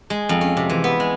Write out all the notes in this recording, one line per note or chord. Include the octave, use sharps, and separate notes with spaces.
G#3
F2
C#4
C3
E3
B3
G#3